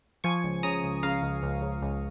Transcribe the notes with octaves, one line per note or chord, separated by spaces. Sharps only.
F3 G#5 C#6
C#2
C#3 A#5 D#6
C#2
C#3 F5 A#5
C#2
C#2
C#3
C#2